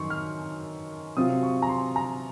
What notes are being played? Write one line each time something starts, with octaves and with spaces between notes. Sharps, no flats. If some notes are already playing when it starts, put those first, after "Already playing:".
Already playing: F#2 D#3 C6 C#6
F6
C3 F#3 C4 F4 D#6
C#6
A#5
C6
A#5